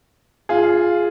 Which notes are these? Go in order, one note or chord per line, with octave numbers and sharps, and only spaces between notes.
F4 G#4